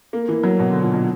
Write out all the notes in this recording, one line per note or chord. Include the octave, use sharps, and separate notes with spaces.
A#3
E3
F#3
B2
D3
A#2
B2